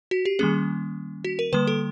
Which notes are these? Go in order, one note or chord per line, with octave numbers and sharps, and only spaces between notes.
F#4
G4
D#3 G3 A#3 C#4 G#4
F#4
A#4
D3 G3 A#3 B4
A4